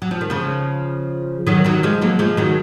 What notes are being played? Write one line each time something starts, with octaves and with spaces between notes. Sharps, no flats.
F#3
F3
D#3
C#3 F3
D#3 F#3
D#3 F#3
F3 G#3
F#3 A#3
F3 G#3
D#3 F#3